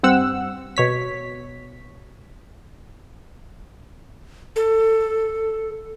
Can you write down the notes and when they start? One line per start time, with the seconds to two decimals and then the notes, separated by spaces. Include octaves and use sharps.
0.03 G2 C4 F#5 E6
0.77 B2 C#5 B6
4.56 A4